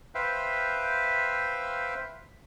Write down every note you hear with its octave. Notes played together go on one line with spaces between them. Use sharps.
B4 C5 E5 F5 G5